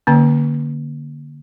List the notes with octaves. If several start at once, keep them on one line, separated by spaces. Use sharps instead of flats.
D3 A#3 C#4